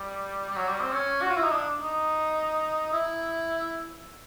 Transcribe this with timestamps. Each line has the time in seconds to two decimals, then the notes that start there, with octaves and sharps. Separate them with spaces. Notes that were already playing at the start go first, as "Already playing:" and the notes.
Already playing: G3
0.49 G3
0.56 F#3
0.68 G3
0.81 C4
0.93 C#4
1.22 F#4
1.30 F4
1.36 E4
1.44 D#4
1.51 D4
1.82 D#4
2.93 E4